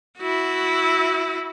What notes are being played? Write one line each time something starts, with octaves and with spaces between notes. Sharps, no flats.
E4 F#4